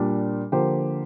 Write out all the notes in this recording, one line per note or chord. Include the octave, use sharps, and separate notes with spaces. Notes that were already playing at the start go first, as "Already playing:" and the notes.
Already playing: A#2 G3 D4
D3 F3 A#3 G4 C5